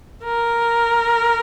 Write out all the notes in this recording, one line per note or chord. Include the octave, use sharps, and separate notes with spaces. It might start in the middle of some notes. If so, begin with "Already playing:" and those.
A#4